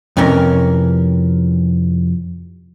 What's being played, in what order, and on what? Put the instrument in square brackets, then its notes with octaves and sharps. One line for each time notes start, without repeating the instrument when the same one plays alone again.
[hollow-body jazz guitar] F2 C3 E3 C#4 A#4